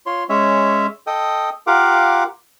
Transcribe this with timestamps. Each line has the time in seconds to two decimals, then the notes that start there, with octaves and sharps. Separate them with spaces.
0.06 F4 C#5 C6
0.29 G#3 C#4 C#5 E5
1.07 A4 D#5 G5 D#6
1.67 F4 G4 A#4 F5 F#5 D6